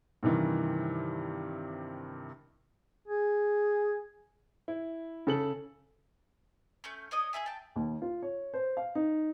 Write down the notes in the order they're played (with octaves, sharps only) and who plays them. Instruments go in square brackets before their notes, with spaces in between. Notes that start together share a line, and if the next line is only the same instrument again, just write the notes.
[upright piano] G2 C3 D#3 E3
[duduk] G#4
[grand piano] E4
C#3 A4 F#7
[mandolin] A3 C#4 G6
D4 C#5 D#5 D#6
G#4 A4 E5 G#5
G5 A5
[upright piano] D#2
F4
C#5
C5
F5
D#4